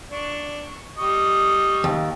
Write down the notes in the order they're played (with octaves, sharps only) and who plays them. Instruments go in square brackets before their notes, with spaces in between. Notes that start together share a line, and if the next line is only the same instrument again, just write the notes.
[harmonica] D4 [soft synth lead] C#6
[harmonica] G3 D#5 [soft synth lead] C#6
[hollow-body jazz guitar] D#2